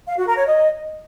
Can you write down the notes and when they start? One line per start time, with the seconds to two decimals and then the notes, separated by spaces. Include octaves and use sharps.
0.08 F5
0.17 F#4
0.27 A#4
0.37 C#5
0.47 D#5